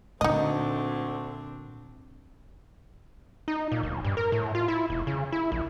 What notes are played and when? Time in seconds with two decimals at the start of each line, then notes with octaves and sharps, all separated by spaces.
0.21 D2 A#2 D3 C4 D4 D#4 D#5
3.48 D#4
3.72 A#2
3.83 D1
4.05 G2
4.17 A#4
4.32 A2
4.55 F4
4.68 E4
4.90 E1
5.07 C#3
5.32 E4
5.52 A#1